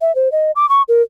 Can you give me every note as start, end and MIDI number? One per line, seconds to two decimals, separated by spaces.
0.01 0.14 76
0.15 0.31 72
0.32 0.51 75
0.56 0.68 86
0.69 0.82 85
0.89 1.02 70